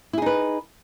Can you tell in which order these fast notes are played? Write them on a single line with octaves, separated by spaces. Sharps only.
E4 G#4 D#4 B4